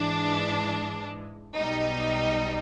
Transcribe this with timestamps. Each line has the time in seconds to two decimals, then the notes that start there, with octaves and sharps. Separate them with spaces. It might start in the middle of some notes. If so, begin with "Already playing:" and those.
Already playing: G#2 E3 G#3 D4
1.58 B1 B2 G3 D#4